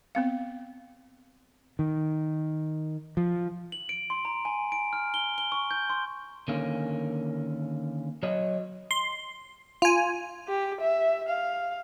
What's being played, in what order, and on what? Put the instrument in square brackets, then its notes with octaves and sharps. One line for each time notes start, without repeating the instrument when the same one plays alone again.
[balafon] B3 C4 F5
[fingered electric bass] D#3
F3
[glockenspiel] F#7
D7
C6
A#5
G#5
D7
F6
G7
G7
C#6
G6
C6
[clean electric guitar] D3 D#3 A#3 C#4
F#3 C#5 D#5
[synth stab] C6
F4 G#5
[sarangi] G4
E5
F5